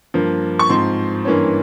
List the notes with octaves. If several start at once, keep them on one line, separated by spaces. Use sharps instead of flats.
G2 F3 A#3
C#6
G#2 F3 C4 C6
G2 E3 A#3 C#4